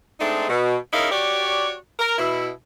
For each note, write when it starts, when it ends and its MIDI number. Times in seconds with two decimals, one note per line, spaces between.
0.20 0.46 56
0.20 0.46 57
0.20 0.46 60
0.20 0.46 62
0.20 0.46 63
0.49 0.76 47
0.92 1.10 61
0.92 1.10 63
0.92 1.10 64
0.92 1.10 68
0.92 1.10 70
0.92 1.10 77
1.11 1.74 66
1.11 1.74 67
1.11 1.74 73
1.11 1.74 74
1.99 2.15 70
2.18 2.50 47
2.18 2.50 64